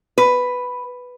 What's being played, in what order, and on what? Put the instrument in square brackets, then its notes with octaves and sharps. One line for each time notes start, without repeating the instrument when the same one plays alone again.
[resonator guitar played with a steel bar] B4